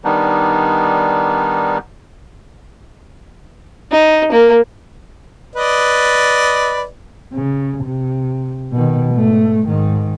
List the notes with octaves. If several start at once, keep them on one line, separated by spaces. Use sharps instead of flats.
D#3 G3 B3 D4 D#4
D#4
A#3
B4 D5 D#5
C#3
C3
B2 D#3
G#2 A3
G#2 D#3